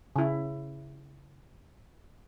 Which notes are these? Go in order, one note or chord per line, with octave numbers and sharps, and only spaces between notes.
C#3 E4